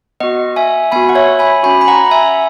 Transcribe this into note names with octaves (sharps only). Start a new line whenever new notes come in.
B3 F#4 D#5 F#5
E5 G#5
B3 F#4 G#5 B5
F#5
C#5 E5
G#5 B5
C#4 F#4 G#5 B5
B5
F#5 A#5
E5 G#5